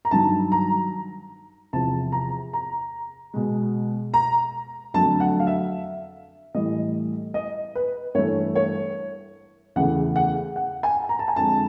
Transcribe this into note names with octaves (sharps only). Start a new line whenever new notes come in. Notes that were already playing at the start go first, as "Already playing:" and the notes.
A#5
G2 D#3 F#3 A5
A#5
E2 C3 F3 A5
A#5
A#5
B2 G#3
A#5
F2 D3 F#3 A3 A5
F#5
F5
E5
A2 E3 G3 D#5
D#5
B4
G2 E3 A3 C#5
C#5
E2 C#3 E3 A3 F#5
F#5
F#5
G#5
A#5
A5
G#5
F2 D3 F3 G#3 A5